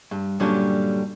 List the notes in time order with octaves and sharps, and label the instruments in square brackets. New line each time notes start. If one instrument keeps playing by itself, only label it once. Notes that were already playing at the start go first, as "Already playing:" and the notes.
[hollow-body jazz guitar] G2
G2 A#2 D3 F#3 G3 C#4